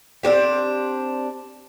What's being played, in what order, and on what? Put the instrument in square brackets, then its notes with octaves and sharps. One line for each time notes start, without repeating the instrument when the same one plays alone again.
[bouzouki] C4 D4 F#4 G4